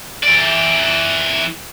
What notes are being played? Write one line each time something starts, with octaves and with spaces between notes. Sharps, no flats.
E3 D5